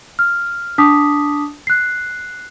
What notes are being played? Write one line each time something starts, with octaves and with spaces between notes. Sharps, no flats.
F6
D4 A5 D6 D#6 B6
F#6 C7